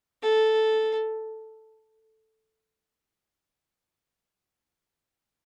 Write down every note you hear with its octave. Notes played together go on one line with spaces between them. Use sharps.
A4